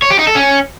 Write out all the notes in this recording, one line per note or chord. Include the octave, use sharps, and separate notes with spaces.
C#5
G4
D#4
A4
C#4